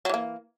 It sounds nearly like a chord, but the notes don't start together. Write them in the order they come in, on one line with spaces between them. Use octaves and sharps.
F#3 E3 A#3